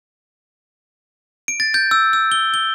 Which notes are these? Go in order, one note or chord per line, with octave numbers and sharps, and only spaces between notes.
D7
A6
G6
E6
E6
G7
G7